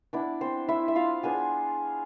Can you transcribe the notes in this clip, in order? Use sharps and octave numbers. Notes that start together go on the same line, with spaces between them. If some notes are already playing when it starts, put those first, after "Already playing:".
B3 D4 E4 D5
C4 C5
E4 E5
E5
F4 F5
B3 D4 F4 G#4 G#5